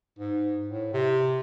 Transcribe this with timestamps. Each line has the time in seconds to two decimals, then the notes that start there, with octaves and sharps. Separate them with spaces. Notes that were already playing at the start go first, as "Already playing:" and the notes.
0.19 G#2
0.69 A2
0.93 C3